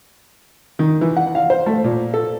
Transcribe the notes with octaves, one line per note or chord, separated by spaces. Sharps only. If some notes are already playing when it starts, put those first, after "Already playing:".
D#3
E3
F#5
F5
C5
A3
A#2
A4